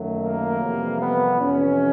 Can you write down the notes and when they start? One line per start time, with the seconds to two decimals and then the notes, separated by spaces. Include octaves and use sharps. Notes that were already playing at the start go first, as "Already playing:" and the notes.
Already playing: F#2 D#3 F#3 A3
0.19 A#3
0.59 F2 C3 E3 G3
1.00 B3
1.40 F2 C3 E3 C#4